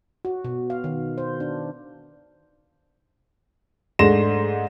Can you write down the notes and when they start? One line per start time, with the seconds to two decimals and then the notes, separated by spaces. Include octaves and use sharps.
0.25 F#4
0.45 B2
0.70 F5
0.84 D#3
1.18 C5
1.40 D4
3.99 G#2 A3 D4 C6 A#6 E7